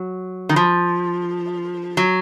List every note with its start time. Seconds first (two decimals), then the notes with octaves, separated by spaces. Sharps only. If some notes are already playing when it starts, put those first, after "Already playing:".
Already playing: F#3
0.49 D#3
0.56 F3
1.97 F#3